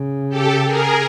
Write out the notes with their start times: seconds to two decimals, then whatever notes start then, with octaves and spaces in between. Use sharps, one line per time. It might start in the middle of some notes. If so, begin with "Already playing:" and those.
Already playing: C#3
0.29 G4 A4
0.65 G#4 A#4